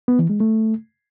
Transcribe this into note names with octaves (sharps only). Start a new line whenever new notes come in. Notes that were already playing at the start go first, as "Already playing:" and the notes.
B3
E3
G#3
A3